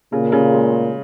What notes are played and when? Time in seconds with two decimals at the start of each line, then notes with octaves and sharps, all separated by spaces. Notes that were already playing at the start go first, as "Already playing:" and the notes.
0.12 A#2 C#3
0.32 C#3
0.53 G#3